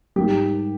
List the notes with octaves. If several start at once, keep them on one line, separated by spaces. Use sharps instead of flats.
G#2 G3 G4